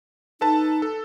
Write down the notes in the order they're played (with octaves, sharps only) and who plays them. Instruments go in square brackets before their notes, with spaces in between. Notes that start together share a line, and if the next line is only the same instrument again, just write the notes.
[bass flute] D#4 [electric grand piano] A4 B4 A5
[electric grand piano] A4